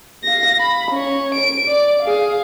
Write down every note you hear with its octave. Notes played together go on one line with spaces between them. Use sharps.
F5 A#6
B5
C#4 C#5
D7
D5
G#4 F5